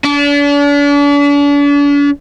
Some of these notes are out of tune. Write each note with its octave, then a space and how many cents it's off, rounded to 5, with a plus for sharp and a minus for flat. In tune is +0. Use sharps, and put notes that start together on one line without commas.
D4 -40